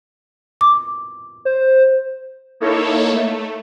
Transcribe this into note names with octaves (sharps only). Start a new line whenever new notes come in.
D6
C5
A#3 D#4 E4 A4 C#5
A3